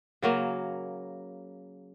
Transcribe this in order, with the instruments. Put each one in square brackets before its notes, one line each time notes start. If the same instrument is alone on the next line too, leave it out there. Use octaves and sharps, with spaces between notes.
[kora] C#3 F#3 A#3